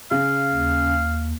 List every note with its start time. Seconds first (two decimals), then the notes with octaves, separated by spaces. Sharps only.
0.11 C#3 F5
0.52 D#2